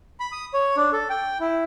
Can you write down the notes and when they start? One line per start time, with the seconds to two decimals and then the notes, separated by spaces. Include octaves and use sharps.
0.20 B5
0.32 D#6
0.54 C#5
0.77 D4
0.93 A4
1.10 G5
1.40 E4